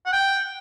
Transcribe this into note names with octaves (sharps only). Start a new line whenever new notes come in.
F#5
G5